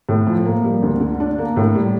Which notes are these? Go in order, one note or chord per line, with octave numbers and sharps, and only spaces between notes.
A2
F3
A#3
G3
D2
D3
D4
A#3
A2
G3